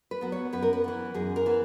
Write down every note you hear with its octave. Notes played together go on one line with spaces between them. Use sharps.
B4
F#3 B3
C#5
F#2 B4
A#4
B4
E3 B3
F#2 G#4
A#4
E3 B3